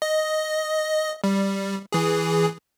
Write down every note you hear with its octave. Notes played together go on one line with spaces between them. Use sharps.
D#5
G3
E3 G#4